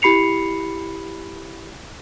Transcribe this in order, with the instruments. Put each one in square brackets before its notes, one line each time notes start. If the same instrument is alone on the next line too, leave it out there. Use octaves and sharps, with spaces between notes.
[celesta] E4 G4 B5 C7 C#7 F7